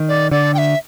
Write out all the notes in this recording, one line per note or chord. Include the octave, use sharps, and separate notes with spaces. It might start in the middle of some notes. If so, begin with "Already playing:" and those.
Already playing: D#3
D5
D3 D5
G5
E5